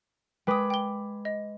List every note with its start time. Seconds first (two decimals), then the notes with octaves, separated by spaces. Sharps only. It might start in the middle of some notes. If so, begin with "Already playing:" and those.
0.47 G#3 B4 G5 D6 D#6
0.70 G5 G7
1.25 D#5